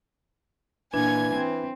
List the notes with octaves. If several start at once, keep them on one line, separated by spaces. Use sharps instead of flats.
A#2 E3 D4 G#5 G#6
C4